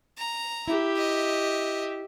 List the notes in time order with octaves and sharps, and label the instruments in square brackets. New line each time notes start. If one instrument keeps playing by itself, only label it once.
[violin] A#5
[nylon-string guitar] E4 [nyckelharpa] G4 E5
[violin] D#5